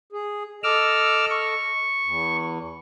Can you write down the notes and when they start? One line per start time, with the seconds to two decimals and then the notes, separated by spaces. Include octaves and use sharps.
0.12 G#4
0.64 A4 D#5 D6 E6 F6
1.30 C#6
2.05 E2